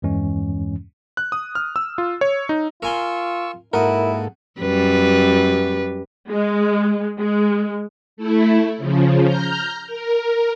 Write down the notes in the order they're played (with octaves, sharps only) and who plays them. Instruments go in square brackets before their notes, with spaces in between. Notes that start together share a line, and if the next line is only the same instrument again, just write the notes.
[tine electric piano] E2 G2 E3 G#3 C#4
[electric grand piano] F#6
D#6
F6
E6
F4
C#5
D#4
[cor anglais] F4 [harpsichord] A#4 G#5 C6 [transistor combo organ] C#6 E6
[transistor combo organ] G#2 A#3 A4 [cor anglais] E4 [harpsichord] F#4 D#5 [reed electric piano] A#4
[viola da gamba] F#2 G3 B4
[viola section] G#3
G#3
[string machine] A3 E4
C#3 F3
A#5 F6 G6
A#4